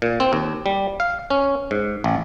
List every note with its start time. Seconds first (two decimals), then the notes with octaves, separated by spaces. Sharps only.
0.02 A#2
0.20 C4
0.33 D#2
0.66 G3
1.00 F5
1.30 C#4
1.71 G#2
2.04 A1